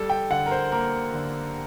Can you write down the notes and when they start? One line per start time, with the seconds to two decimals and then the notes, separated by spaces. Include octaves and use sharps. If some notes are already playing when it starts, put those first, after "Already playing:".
Already playing: G3 A4
0.10 G5
0.30 D3 F#5
0.46 A#4
0.51 C5
0.72 A#3 A#4
1.14 D3